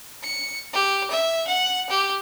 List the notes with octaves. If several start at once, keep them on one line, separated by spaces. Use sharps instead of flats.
C#7
G4
E5
F#5
G4